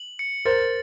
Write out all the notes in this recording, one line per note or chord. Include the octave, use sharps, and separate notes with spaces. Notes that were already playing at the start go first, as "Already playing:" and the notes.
Already playing: F#7
C#7
A#4 C5 A6